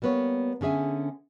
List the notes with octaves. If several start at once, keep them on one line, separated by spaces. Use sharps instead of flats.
G3 A#3 B3 B4 C#5
D3 C#4 G#4 E5 G#5